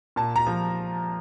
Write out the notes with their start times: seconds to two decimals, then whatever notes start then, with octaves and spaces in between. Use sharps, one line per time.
0.16 A#2 A5
0.36 A#5
0.46 F3